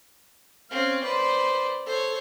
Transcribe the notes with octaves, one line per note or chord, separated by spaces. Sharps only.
C4 C#4 F5
B4 C5 D5
A4 C5 C#5